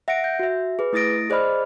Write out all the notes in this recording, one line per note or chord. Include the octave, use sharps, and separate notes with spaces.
E5 F#5 A#6 C#7 D7
G6
F#4 E5
G#4 B4
A3 E4 D#6 A6 A#6 D7
G#4 C5 D5 D#5 B5 F6